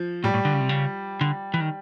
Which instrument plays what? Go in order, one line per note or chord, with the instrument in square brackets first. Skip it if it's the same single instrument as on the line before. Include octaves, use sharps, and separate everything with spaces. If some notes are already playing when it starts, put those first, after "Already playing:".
Already playing: [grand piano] F3
[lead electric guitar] A2 [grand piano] G3
[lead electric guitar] A2
D3
C#3
C3
C#3
D3
E3
D#3